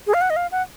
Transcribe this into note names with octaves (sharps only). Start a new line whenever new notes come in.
G#4
F5
F#5
D#5
F5
F#5